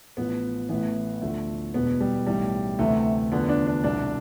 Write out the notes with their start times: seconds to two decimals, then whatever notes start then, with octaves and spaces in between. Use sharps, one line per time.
0.17 A1 A2 F3 B3
0.69 A1 A2 E3 B3
1.22 D2 D3 F3 A3
1.74 E1 E2 B2 B3
2.01 G3
2.27 B1 A2 E3 G3
2.79 D2 C3 E3 A3
3.31 E2 D3 F3 B3
3.49 D4
3.67 D4
3.84 C2 B2 D4